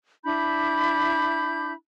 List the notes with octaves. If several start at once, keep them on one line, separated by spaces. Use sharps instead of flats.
D4 E4 B5 G6